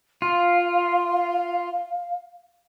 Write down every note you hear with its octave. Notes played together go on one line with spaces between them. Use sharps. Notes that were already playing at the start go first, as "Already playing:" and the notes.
F4 F5